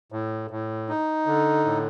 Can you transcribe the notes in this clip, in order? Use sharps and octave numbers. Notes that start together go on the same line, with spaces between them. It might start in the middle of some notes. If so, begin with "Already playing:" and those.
A2
A2
D#4
D3
A2